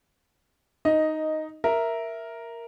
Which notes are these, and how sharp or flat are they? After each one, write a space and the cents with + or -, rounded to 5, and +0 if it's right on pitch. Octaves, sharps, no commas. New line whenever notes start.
D#4 +0 D#5 +5
A#4 +0 E5 +0